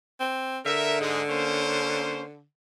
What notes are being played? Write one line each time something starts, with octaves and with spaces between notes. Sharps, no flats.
C4
D3 A#4 E5
G#2 G#3
A#3 C#4 C5